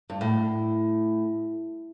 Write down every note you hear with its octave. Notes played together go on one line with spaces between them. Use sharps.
G2
A2